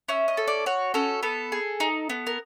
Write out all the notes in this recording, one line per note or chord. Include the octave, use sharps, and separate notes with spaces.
C#4 E5
D#5
A4
D5
F#4 C#5
C#4 A4
B3 A4
G#4
D#4
B3
A#4